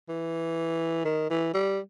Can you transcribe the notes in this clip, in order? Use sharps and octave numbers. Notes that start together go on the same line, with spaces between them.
E3
D#3
E3
G3